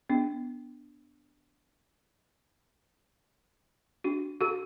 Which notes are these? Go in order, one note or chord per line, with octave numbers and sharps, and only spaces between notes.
B3 D4
D4 F#4
F#4 A4